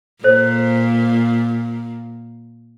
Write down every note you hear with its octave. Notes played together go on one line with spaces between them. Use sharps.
A#2 A4 C5